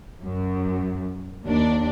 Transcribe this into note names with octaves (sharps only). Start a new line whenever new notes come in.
F#2
D#2 D4